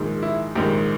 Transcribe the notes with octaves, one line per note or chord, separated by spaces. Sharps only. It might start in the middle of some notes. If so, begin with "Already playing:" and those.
Already playing: A#1 G#2 D#3
E4
A#1 G#2 D#3 G4